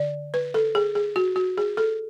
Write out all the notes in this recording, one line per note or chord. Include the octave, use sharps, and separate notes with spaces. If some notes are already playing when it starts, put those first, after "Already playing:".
Already playing: D3 D5
B4
A4
G#4
G#4
F#4
F#4
G#4
A4